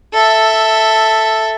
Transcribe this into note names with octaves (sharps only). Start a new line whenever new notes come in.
A4 E5